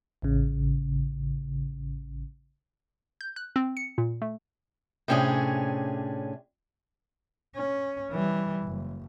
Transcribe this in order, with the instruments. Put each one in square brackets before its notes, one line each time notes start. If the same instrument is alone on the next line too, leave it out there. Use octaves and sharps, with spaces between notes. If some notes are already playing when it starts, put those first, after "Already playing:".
[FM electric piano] A1 C#3
[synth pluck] G6
F#6
C4
C#7
A#2
A3
[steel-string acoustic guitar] A2 C3 C#4 D4 G#4
[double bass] C#4
E3 G3
F#1